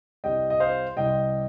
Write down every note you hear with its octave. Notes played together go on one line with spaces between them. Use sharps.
C2 C3 G3 D#5 G5
D#5
C5 F5
C2 C3 G3 D#5 G5